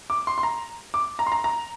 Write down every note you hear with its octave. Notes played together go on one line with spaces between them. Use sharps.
D6
C6
C6
A#5
D6
A#5
C6
A#5
A#5